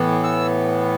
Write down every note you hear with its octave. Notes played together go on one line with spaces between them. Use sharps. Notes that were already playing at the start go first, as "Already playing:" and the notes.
Already playing: A2 E3 B3
E6